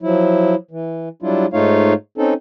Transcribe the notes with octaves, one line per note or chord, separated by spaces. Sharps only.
F3 F#3 E4
E3
F#3 G3 D4 E4 F4
G#2 A3 D#4 F4 C#5 F5
C4 C#4 D#4 A4